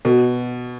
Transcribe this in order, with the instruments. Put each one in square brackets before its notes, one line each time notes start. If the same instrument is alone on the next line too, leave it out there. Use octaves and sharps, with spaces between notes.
[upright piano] B2